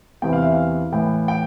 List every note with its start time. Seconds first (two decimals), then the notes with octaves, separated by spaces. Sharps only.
0.22 E2 C3 E3 G5
0.33 F5
0.42 E5
0.52 F5
0.92 A2 E3 G5
1.28 G5